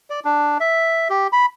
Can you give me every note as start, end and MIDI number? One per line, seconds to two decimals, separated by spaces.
0.10 0.20 74
0.25 0.58 62
0.60 1.08 76
1.10 1.27 67
1.32 1.46 83